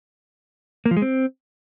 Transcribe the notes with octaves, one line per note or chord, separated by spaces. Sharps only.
A#3
F3
G#3
C4